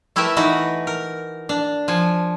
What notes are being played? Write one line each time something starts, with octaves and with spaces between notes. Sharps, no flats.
A3 E4 G4 A#4 B4 E5
E3 D#4 F#4 B4
A#4
D4
F3 G#5